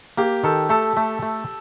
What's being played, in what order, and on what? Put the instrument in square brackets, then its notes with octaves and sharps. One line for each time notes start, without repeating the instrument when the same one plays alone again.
[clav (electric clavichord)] A#3 [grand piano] G4
[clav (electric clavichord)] D#3 [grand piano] A4
[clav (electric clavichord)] A3 [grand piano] A4
[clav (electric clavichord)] A3
A3